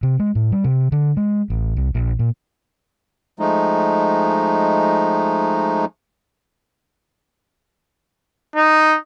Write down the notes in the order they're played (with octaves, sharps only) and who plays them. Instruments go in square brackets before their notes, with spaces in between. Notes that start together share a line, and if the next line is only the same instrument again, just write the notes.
[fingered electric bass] C3
G#3
A2
G3
C3
D3
G#3
A1
C2
A#1
A#2
[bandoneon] F3 G#3 A3 D#4
[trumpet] D#4